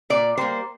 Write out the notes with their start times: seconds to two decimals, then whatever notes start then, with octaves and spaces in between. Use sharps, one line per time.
0.10 A#2 D5
0.37 G3 A#3 C5